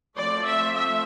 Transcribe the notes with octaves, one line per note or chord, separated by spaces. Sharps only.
F3 A3 C4 D5
E5
E5